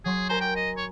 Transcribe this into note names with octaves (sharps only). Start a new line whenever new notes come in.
F#3 G#4 C6
A#4 C5 G#5 A#5
G5
D#5
C#5